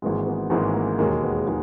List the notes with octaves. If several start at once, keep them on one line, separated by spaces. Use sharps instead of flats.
G#1 G#2 E3 G#3 A#3
B3
G#1 G#2 E3 G#3 A#3
A#3
E1 D#2 D#3 G#3 A#3
B3
D#3 G#3